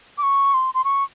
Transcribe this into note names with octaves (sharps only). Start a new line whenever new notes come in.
D6
C#6
C6
C6
C#6